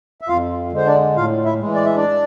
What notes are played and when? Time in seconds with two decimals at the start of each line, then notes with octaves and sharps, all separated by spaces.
0.21 E5
0.28 F2 F4 F5
0.72 D3 G#3 C5
0.87 D4 D5
1.16 A2 F4 F5
1.45 E4 E5
1.60 E3 G#3
1.75 D5
1.85 E5
1.96 D4 D5